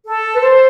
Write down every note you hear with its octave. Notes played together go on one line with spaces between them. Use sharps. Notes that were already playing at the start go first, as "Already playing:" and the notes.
A4
B4
C5